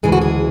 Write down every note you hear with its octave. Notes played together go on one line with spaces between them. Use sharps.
D2 C#3 E3 G#3 G#4
F#4
G#4